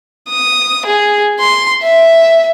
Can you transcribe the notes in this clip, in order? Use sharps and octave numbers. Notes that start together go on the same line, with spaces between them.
D#6
G#4
C6
E5